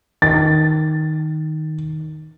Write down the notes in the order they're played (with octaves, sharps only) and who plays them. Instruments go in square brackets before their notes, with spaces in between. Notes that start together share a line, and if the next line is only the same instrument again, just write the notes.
[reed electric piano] D#3 [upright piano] A6